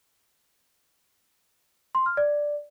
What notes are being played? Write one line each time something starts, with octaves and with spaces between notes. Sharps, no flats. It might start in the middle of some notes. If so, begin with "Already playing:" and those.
C6
F6
D5